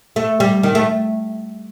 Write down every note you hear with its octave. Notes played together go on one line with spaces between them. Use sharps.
A3
G3
D#3
A3